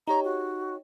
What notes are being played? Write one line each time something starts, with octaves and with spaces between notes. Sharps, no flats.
D#4 G4 C#5 A#5
F#4